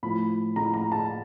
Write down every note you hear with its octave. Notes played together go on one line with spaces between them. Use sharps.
A2 F3 A3 B5
A2 F3 A3 A#5
A#5
A5